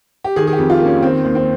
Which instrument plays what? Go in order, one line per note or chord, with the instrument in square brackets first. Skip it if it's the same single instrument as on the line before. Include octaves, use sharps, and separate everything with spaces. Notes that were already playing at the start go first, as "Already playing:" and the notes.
[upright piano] G4
D#3 G#4
G#4
G4
F2
F4
A#3
C#4
D#3 C4
D#2
C4